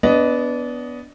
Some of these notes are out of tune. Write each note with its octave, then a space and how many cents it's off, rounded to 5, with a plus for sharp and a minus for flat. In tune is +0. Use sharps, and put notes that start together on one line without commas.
B3 +0 D4 -25 D#5 +0